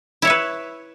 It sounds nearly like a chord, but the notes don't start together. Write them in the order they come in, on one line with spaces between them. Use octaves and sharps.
E4 C#5 E5 B4